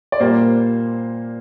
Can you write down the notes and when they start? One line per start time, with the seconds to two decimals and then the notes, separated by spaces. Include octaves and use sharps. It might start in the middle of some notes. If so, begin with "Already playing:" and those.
0.12 D5
0.20 A#2 G3 A#3 C5